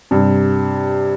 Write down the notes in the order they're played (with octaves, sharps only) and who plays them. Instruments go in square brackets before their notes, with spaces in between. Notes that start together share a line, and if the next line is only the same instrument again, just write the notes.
[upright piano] G2 C3